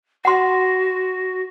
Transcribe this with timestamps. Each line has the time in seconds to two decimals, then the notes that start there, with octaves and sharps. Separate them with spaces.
0.25 F#4 F#5 C6